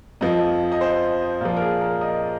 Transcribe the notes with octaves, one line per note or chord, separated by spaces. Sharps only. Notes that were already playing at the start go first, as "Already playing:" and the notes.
F2 F3 D#5
D#5
C5
A#2 F3 F4
A#4
G#4
A#4
D#5